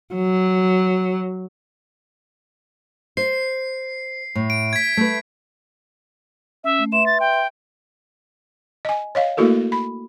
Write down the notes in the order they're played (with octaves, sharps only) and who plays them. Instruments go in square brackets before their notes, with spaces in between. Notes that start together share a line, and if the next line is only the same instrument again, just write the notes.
[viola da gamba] F#3
[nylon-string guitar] C5 [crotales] C7
[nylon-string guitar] A2
[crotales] D7
G#6 B6
[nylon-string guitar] A3 B4
[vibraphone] C#4 [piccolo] E5
[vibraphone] A3
[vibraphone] B4 E5 C6 [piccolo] E7
[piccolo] A6
G5
[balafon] D#5 G#5
C#5 D#5 F5
A3 A#3 E4 F#4 A4 A#4
B5